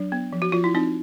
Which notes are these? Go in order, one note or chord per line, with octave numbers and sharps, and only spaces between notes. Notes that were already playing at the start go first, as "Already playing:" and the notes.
Already playing: F#3 D4
B3
F3
F#4
F3 F4
E4
C4 D#4